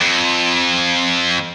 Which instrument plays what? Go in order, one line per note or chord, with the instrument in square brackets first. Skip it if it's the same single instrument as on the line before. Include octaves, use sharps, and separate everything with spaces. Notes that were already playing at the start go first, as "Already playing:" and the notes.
[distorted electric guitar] F2